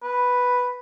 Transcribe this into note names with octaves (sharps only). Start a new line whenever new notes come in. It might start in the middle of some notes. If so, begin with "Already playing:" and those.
B4